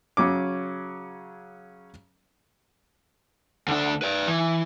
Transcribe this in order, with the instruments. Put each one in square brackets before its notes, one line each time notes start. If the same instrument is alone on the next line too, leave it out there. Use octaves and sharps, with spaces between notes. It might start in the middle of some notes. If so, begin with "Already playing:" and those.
[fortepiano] C#3 F#3 C#4 D6
[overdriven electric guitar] D2 D4
B4 D5
E3